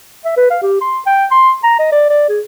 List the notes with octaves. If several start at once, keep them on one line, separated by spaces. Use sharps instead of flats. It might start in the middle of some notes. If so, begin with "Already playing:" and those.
E5
B4
F5
G4
C6
G5
C6
A#5
D#5
D5
D5
G#4